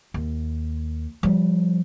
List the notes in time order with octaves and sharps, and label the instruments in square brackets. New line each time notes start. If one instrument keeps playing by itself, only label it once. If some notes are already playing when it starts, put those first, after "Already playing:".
[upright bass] D#2
F3 G3